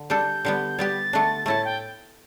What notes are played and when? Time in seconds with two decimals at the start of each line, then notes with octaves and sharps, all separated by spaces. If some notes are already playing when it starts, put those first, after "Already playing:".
Already playing: D3
0.10 G3 D4 A4 G6
0.45 D3 G3 B3
0.79 G3 B3 G4 A6
1.13 D3 A3 D4
1.46 A2 A3 E4 A4 A6
1.65 G5